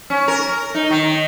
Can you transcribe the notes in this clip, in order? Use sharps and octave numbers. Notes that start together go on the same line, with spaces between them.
C#4
A#4
D#4
D#3